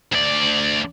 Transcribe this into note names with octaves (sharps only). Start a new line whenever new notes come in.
D2 D5